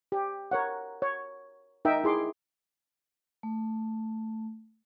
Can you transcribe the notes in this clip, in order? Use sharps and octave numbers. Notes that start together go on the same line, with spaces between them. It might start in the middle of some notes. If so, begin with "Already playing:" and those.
G4
A#4 C#5 F#5
C#5
D#4 A#4 D#5 E5 G5
E4 G#4 C6 D6
A3